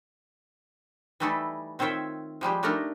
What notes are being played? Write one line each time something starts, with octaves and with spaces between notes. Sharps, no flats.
E3 G3 A3 D#4 E4 A4
D#3 C4 F4 C#5 E5 G5
F3 G3 G#3 G4
A3 D4 D#4 A#4 A#5